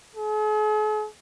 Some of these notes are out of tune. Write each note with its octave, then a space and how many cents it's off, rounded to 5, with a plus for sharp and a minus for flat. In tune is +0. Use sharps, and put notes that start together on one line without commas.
G#4 +45